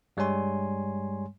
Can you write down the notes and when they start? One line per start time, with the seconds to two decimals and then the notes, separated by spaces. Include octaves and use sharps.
0.17 G2 G3 G#3 C#5 G#5 C6